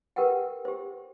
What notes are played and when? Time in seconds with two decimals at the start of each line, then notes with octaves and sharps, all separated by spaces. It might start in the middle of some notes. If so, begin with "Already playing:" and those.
0.16 G4 A#4 B4 F#5 G5
0.65 G4 C5